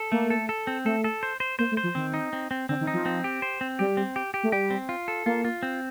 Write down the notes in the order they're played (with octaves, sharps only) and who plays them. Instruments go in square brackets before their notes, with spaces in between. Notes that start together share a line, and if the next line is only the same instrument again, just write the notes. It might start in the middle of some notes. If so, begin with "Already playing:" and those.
Already playing: [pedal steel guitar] A4
[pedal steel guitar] A3 [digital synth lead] A#3
[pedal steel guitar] A4
A4
C4
[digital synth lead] A3 [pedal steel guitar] A4
[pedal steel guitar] A4
C5
C5
[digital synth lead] A#3 [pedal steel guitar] C5
[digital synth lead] A3
[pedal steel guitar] C5
[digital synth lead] F3
[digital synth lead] D#3 [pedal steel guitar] C4
[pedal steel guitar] D#4
C4
C4
[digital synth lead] D3 [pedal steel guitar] C4
[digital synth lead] D#3
[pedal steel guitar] D#4
[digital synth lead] F3
[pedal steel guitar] C4
G4
C5
C4
[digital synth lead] G3 [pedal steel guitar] G4
[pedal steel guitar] C4
G4
G4
[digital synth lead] A3
[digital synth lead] G3 [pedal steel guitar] G4
[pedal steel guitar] C4
F4
A4
[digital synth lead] A#3 [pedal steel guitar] F4
[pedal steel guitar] F4
C4